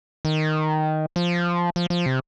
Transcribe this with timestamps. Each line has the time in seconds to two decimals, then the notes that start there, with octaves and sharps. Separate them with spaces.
0.25 D#3
1.16 F3
1.76 F3
1.90 F3
2.06 C3